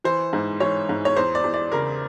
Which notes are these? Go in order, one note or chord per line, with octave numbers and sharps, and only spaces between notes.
E3 C5
G#2
E3 C#5
G#2
C#5
E2 C5
D5
E2
D5
C#3 A#4